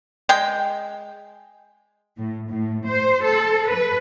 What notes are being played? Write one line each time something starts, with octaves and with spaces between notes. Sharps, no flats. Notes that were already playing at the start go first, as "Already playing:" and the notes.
G#3 G5
A2
A2
C5
A4
B4